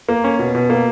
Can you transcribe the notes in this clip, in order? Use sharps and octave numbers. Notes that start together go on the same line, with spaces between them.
A#3
C#4
B2
B2
A#3